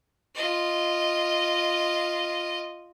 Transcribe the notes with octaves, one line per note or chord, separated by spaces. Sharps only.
F4 D#5